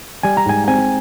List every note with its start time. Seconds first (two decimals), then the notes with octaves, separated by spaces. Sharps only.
0.23 G3 G#5
0.37 A#5
0.46 G#2 G#5
0.68 C4 G#5